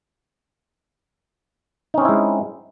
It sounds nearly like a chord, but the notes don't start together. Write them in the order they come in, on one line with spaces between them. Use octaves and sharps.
D#4 C#4 C4 E4 G#3